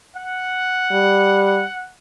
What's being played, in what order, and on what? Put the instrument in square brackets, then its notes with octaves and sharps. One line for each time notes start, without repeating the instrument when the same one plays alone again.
[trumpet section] F#5
[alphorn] G3